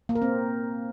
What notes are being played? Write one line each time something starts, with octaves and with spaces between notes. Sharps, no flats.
A#3
A#4
C4